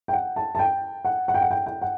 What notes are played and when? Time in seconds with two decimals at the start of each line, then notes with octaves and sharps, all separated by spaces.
0.08 G5
0.13 F#5
0.36 A5
0.55 A5
0.59 G5
1.05 F#5
1.28 F#5
1.34 G5
1.42 F#5
1.51 G5
1.66 G5
1.82 F#5